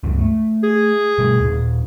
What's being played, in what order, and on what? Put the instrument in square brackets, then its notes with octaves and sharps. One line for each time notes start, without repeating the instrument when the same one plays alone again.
[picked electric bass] C#2 G2 C#3
A3
[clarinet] G#4
[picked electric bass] B2 G3 A3
D#2 A#2